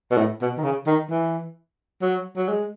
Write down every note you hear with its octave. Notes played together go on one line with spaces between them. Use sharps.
B2
A2
B2
D#3
C#3
D#3
E3
F#3
F#3
G#3